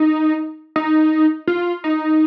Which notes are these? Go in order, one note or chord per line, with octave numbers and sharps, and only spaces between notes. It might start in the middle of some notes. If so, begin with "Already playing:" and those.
Already playing: D#4
D#4
F4
D#4